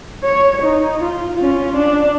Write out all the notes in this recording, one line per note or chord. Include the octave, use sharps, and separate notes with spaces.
C#5
D#4
F4
C#4 F4
D4